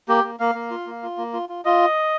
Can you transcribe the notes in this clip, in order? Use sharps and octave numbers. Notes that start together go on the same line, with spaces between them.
A#3 G4
A#3
A#3 F5
A#3
F4
A#3
F4
A#3
F4
F4
F4 D#5